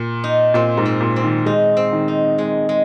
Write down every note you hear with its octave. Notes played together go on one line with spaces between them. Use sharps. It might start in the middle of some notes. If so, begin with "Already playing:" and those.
Already playing: A#2
D#4
A#2 C4
G#2
C4
A#2
C4
D#3
G#3 D#4
C4
D#3
D#4
G#3
G#3